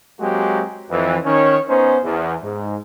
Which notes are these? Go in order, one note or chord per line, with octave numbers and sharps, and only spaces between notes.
F#3 G#3 A#3 C4 F#4 G4
F2 E3
D#3 C#4 C#5
B3 C#4 D#4 C5
E2
G#2